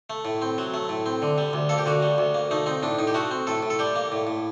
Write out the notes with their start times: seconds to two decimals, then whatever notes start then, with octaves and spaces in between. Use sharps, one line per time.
0.10 A3
0.25 A2
0.42 C4
0.58 F#3
0.74 A3
0.89 A2
1.06 C4
1.22 D3
1.38 G3
1.53 D2
1.69 A#3 A4
1.78 G4
1.86 D3 F#4
2.02 G3
2.18 D2
2.34 A#3
2.51 A3 D#4
2.66 C4 D#4
2.83 A2 D4
2.98 A2 D#4
3.07 G4
3.14 A3 F#4
3.31 C4
3.47 A2 A4
3.63 A2
3.70 A4
3.79 G3 G4
3.96 A#3
4.12 A2
4.27 A2